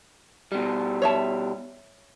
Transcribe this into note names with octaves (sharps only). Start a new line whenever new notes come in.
B2 G3
C#5 E5 A5